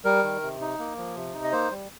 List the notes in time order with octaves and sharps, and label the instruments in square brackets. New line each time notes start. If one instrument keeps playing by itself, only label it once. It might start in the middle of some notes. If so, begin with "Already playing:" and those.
[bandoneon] G3 A#4
D#3
C3
D#4
A#3
F3
C3
D#4
D#5
A#3 C5
G3